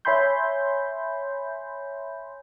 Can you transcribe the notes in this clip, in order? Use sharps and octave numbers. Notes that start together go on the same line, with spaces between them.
C#5 E5 G#5 B5 C6 G6